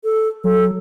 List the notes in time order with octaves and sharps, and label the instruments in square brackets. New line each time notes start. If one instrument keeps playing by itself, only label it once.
[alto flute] A4
[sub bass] F#3 [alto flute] A4